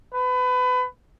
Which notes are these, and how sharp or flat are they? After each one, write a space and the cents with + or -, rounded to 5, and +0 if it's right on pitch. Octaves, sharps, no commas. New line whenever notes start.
B4 +30